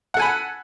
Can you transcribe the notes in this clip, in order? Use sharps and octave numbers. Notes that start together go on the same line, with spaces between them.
A4 F#5 G#5 B5